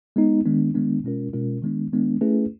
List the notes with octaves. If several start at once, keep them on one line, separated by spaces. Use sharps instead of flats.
G#3 B3 D#4
D#3 G#3 B3 D4
D#3 G#3 B3 D4
B2 G#3 C#4 F4 A#4
B2 G#3 C#4 F4 A#4
D#3 G#3 B3 D4
D#3 G#3 B3 D4
A3 C#4 E4 G#4 B4